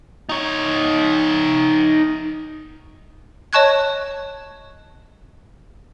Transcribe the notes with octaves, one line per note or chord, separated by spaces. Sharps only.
D#4 C#5
C#5 D#5 A5 C#6 F#6 G#6